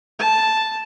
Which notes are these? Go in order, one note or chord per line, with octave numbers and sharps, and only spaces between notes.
A5